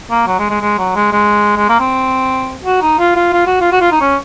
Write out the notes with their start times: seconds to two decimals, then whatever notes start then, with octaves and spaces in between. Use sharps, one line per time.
0.11 A#3
0.27 F#3
0.39 G#3
0.50 G#3
0.61 G#3
0.78 F#3
0.96 G#3
1.12 G#3
1.57 G#3
1.69 A#3
1.80 C4
2.65 F#4
2.82 D#4
2.99 F4
3.16 F4
3.33 F4
3.47 F#4
3.61 F4
3.72 F#4
3.81 F4
3.91 D#4
4.01 C#4